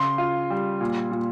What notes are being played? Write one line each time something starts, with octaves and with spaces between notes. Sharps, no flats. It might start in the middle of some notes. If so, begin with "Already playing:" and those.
Already playing: C#3 C6
F4
G3
A#2
A#2